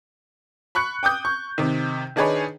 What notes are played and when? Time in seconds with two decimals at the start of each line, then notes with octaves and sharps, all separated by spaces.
0.75 B5 C#6 F#6 C#7
1.03 G5 D6 D#6 G6
1.25 C#6
1.58 C3 D#3
2.16 D#3 D4 D#4 G#4 B4 C#5